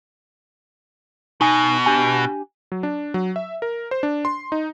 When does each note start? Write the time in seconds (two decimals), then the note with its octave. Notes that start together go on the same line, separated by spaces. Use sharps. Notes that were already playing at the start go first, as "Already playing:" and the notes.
1.41 B2 D#4 G#5
1.86 D4 G4 G#5
2.72 F#3
2.83 D4
3.14 F#3
3.36 E5
3.62 A#4
3.91 C5
4.03 D4
4.25 C6
4.52 D#4